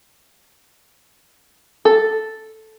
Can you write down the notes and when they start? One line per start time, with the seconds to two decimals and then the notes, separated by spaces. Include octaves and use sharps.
1.85 A4